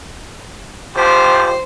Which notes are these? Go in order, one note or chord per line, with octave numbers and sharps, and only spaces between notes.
G#1 F3 G4 C5